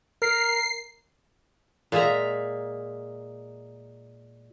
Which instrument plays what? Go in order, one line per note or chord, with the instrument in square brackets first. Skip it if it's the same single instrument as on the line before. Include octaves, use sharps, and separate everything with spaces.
[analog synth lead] A#4 [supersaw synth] C7
[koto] A#2 G#3 E5 A#5